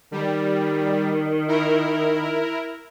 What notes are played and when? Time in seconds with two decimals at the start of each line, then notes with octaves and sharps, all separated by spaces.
0.12 D#3 G3
1.48 E4 A#4